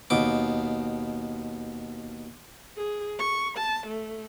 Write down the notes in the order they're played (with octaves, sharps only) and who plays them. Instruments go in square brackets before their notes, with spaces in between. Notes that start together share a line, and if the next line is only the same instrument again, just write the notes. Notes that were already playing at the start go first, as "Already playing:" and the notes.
[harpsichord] D#2 B2 D6
[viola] G#4
C#6
A5
A3